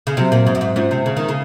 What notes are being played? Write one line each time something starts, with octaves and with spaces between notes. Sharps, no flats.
C#3
C3 F#3 C4 F#4 C5
A#2
G#2
F#2
G#2
G#2 G#3 C#4 F4 C5
C3
C#3
D#3
C#3